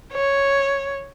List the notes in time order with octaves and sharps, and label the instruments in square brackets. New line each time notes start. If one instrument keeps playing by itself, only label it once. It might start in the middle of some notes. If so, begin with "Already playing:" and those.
[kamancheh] C#5